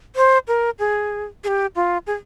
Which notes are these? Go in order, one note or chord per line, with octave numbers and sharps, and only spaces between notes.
C5
A#4
G#4
G#4
G4
F4
G#4